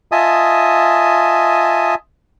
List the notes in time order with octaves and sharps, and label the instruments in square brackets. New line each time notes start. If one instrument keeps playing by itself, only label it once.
[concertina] F4 D#5 E5 G#5 A5 D#6